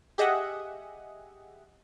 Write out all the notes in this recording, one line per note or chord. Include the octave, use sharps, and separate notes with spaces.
G4 G#4 D#5 E5 F#5